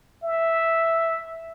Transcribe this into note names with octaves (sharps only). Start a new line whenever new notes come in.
E5